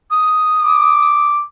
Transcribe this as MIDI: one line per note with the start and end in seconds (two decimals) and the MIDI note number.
0.11 1.30 87
0.62 1.44 86